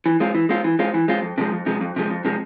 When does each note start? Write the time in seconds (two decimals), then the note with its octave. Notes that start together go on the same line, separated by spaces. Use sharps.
0.06 E3
0.20 G#3 C4 F4
0.35 E3
0.49 G#3 C4 F4
0.64 E3
0.79 G#3 C4 F4
0.94 E3
1.08 G#3 C4 F4
1.22 F2
1.38 C3 F3 G#3
1.52 F2
1.66 C3 F3 G#3
1.81 F2
1.96 C3 F3 G#3
2.10 F2
2.25 C3 F3 G#3